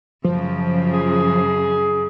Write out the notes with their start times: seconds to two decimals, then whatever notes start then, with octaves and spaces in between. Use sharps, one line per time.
0.24 F#2 C#3 F3
0.94 G#4